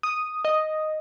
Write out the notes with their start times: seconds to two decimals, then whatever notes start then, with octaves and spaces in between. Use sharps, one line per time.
0.03 D#6
0.45 D#5